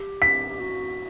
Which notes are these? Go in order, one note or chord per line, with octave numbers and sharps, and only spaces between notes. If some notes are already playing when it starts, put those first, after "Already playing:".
Already playing: G4
B6
G4
F#4